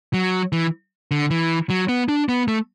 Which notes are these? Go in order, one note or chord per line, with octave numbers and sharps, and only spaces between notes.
F#3
E3
D3
E3
F#3
B3
D4
B3
A3